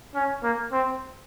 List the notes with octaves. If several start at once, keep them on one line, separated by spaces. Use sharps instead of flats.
C#4
A#3
C4